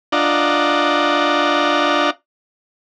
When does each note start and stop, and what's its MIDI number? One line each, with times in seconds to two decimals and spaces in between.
0.12 2.10 62
0.12 2.10 65
0.12 2.10 74
0.12 2.10 75
0.12 2.10 78
0.12 2.10 82